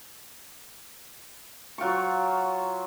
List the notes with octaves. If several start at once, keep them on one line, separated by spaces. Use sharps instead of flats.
F#3 F4 G5 C#6